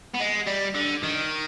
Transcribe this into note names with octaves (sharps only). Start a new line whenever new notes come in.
B3
G#3
G3
D3
D#3